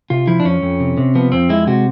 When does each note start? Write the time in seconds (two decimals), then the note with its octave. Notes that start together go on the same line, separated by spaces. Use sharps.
0.10 C3 F4
0.27 F3 E4
0.40 D4
0.45 F2 C#4
0.62 F2
0.80 C3
0.98 C3
1.15 F3 B3
1.32 F2 C4
1.49 G#3 E4
1.67 C3 F#4